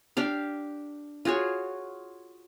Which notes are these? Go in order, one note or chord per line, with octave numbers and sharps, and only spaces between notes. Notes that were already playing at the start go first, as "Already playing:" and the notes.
D4 G4 F5
F4 F#4 G#4 C#5